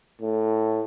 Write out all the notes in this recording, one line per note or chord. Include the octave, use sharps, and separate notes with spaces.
A2